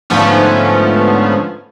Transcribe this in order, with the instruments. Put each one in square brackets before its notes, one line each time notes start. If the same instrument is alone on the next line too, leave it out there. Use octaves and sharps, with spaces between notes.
[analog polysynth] G#2 D3 F3 A3 B3 C#4